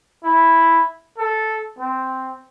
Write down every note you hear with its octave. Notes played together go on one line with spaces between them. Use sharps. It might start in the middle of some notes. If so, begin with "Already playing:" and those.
E4
A4
C4